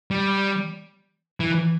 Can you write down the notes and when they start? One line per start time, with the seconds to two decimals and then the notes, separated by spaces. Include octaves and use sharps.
0.11 G3
1.40 E3